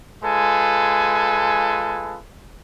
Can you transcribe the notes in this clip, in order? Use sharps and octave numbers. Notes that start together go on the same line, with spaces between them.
G#3 F4 A4 B4 G#5